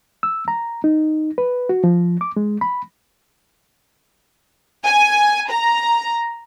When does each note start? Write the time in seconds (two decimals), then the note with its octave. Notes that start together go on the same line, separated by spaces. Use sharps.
0.23 E6
0.48 A#5
0.84 D#4
1.38 B4
1.69 F#4
1.84 F3
2.21 D6
2.37 G#3
2.61 B5
4.85 G#5
5.50 A#5